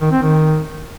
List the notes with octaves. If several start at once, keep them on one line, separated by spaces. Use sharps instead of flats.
D#3
C4
D#3